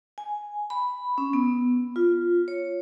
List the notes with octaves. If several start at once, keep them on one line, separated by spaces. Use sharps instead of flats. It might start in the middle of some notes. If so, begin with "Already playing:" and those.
G#5
B5
C#4
B3
F4
C#5